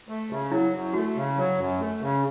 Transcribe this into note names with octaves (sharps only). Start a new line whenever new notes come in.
A3
C#3
F#3 E4
F#2
A3 F#4
C#3
F#3
F#2
A3
C#3